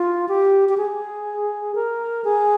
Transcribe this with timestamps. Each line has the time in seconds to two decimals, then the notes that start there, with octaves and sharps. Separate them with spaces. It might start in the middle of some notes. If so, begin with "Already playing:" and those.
Already playing: F4
0.28 G4
0.69 G4
0.78 G#4
1.75 A#4
2.24 G#4